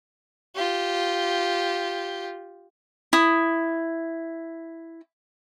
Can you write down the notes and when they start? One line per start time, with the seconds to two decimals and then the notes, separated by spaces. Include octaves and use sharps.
0.55 F4 G4
3.13 E4 D#6